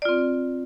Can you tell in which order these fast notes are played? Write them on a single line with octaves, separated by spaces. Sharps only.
D5 F4 C4